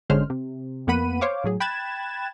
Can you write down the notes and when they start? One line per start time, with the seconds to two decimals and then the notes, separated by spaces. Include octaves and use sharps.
0.10 G#1 D3 G#3 C#4 C5 F6
0.30 C3
0.87 F2 A#3 B3 F#5 B5 D#7
1.21 C5 C#5 F5 D6
1.44 A2 F#3 G#4
1.60 G5 B5 F#6 G#6 A6 E7